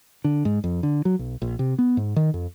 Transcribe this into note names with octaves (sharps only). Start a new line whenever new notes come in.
D3
G#2
F2
D3
F#3
B1
A#1
C3
B3
G#2
D#3
F2